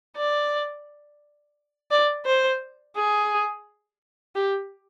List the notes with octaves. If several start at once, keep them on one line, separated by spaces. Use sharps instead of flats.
D5
D5
C5
G#4
G4